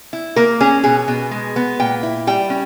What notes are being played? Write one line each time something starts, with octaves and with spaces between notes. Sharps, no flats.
E4
A#3 A#4
C#4 G#4
B2 G#4
B2
G#3
B3
A#2 G5
E4
G3 G5
C#4